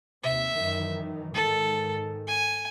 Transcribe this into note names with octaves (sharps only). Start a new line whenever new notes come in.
D#2 C3 E5
F#2 D#3 E3
G#2 D#3 A4
G#5